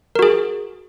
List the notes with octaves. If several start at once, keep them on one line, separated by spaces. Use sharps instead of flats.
F#4 G#4 A#4